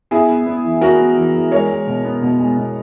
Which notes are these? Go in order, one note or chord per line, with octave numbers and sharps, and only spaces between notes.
B3 E4 G#4
B3
B3
E3
B3 F#4 A#4
B3
E3
E3
G#3 A#4 C#5
G#3
B2
B3
B2
G#3
B2